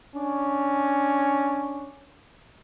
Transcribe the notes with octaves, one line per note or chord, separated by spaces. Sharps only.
C#4 D4